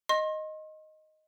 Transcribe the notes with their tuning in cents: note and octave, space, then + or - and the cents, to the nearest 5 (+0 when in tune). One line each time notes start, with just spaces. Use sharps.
D#5 +0 C6 +40